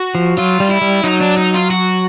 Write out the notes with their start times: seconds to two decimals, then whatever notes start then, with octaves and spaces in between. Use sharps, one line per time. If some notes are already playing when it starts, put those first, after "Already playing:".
Already playing: F#4
0.15 F3
0.37 F#3 F4
0.60 G3
0.70 E4
0.81 G3
1.04 F#3 D#4
1.21 D4
1.37 D#4
1.54 F4
1.70 F#4